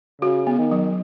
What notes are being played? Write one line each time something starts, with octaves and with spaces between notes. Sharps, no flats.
C#3 F#4
B3
D#3
F#3